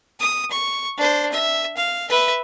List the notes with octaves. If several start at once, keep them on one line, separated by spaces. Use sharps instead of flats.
D#6
C#6
D4 C5
E5
F5
B4 E5